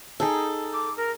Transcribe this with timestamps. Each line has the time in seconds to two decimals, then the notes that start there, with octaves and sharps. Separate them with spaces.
0.20 D#4 G#4 A4 G5
0.73 D6
0.96 A#4